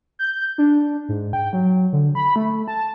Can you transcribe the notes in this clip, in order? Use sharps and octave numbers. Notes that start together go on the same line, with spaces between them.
G6
D4
G#2
G5
F#3
D3
B5
A3
A5